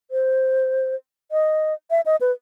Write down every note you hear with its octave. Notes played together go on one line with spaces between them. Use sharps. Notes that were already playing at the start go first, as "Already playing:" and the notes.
C5
D#5
E5
D#5
B4